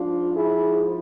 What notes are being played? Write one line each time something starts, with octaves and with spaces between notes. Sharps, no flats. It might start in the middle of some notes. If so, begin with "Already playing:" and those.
Already playing: G#2 F3 D4 F4
E4 G#4